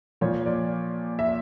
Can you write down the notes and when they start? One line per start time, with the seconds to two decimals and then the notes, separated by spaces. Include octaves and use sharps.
0.21 A#2 F3 C#5
0.46 D5
1.19 E5